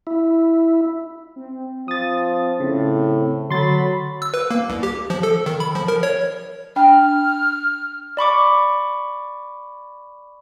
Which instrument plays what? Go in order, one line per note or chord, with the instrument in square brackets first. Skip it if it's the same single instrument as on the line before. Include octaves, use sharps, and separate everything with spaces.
[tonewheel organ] E4
[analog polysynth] C4
[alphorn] F3 [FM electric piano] D#6 A6
[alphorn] A2 [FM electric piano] C#3
[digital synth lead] D3 [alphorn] F#3 [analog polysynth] B5 [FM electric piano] C6 A6
[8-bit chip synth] E6
B4
A#3
C2
G4
F3
A4
D#3
B5
F3
A#4
C#5
[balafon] D4 G5 [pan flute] F6
[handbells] D5 B5 C#6 D6